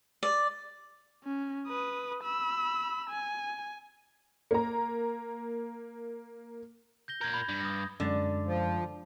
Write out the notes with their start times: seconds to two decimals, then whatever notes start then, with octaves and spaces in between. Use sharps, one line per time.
0.23 D5
1.24 C#4
1.68 B4 D#6
2.23 B5 E6
3.10 G#5
4.51 A#3 A#5
7.08 G6 A#6 G7
7.21 A#2 A#4 G6 G#6
7.34 B5
7.49 G2
7.61 D#6 A#6
8.00 F#2 D3 G#3 A6
8.46 F3